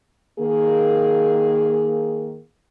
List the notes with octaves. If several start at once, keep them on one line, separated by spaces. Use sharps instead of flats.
D#3 A#3 G#4